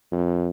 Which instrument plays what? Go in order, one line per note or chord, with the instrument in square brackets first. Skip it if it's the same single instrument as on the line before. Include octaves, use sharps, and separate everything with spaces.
[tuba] F2